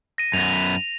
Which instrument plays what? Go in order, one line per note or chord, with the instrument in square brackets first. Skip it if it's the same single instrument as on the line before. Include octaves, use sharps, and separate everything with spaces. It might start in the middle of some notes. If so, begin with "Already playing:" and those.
[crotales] A#6 D#7
[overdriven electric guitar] F#2 B3 [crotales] F7